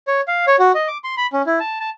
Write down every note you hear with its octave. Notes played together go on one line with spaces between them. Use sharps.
C#5
F5
C#5
F#4
D#5
D6
C6
B5
C#4
E4
A5
A5